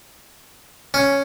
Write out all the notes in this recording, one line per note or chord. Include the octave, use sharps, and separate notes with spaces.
C#4